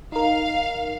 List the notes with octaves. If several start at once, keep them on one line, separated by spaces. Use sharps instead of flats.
D#4 A#4 F5